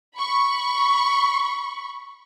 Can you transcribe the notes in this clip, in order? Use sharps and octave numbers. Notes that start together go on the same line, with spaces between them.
B5 C#6